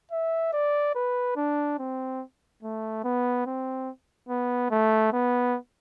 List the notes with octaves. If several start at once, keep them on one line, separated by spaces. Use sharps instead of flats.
E5
D5
B4
D4
C4
A3
B3
C4
B3
A3
B3